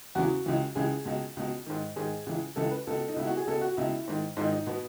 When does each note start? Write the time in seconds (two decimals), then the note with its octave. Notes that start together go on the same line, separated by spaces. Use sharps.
0.15 E2 C#3 E3 F#4
0.46 C#2 C#3 E3
0.75 C#2 C#3 E3 G#4
1.05 C#2 B2
1.37 C#2 B2
1.66 G#2 D#3
1.96 G#2 D#3 G#4
2.26 C#2 C#3 E3
2.56 C#2 C#3 E3 A4
2.71 B4
2.87 C#2 B2 A4
3.08 D#4
3.16 C#2 B2 E4
3.27 F#4
3.37 G#4
3.47 C#2 B2 A4
3.61 F#4
3.77 C#2 B2 E4
4.08 G#2 D#3
4.37 G#2 D#3 D#4
4.52 D#4
4.67 B2 B3